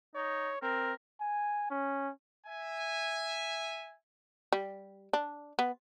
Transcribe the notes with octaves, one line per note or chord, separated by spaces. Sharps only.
D#4 C#5
C4 A#4
G#5
C#4
E5 G#5
G3
D4
B3